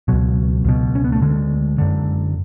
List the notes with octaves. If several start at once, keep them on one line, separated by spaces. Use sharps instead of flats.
C#2 B2 F#3
C#2 B2
C#4
B3
A3
D2 D3 G#3
F#2 D3